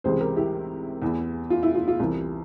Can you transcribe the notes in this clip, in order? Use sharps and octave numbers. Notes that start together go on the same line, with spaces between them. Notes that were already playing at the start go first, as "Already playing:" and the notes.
C#2 C3 E3 G#4 C5
G4 A#4
E4 G4
E2 E3
F4
E4
F4
F4
C2 C3 E3